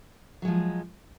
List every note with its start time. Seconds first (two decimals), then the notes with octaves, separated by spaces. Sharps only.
0.42 F#3
0.45 G#3
0.48 F3